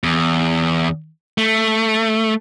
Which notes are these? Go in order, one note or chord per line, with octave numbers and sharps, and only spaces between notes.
E2
A3